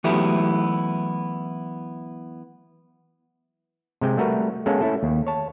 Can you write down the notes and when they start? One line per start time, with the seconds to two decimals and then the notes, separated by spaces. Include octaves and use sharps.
0.04 E3 F#3 A3 B3 E4 G4
4.01 C3 G#3 G5
4.17 G3 A3 F#4 A#4 B4
4.66 G#3 A#3 B3 C#4 A4
4.81 A3 C#4 E4 A4
5.03 D#2
5.27 C#5 A5